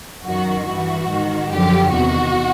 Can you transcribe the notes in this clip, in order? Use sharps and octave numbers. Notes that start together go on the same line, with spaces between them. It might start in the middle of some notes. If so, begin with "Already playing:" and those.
F#2 D#3 F#4
G2 E3 F#4
G#2 D#3
F#2 D3 F3 G4
E2 C3 D#3 F#4